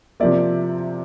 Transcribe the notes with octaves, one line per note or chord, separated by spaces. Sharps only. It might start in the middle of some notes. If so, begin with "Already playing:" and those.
C3 F3 A#3 D5 E5